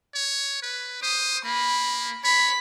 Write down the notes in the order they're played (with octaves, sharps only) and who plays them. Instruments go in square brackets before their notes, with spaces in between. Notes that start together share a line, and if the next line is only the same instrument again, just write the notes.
[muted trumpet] C#5
B4
[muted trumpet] C5 [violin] D#6
[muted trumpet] A#3 [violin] B5
[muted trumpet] C#5 [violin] B5 B6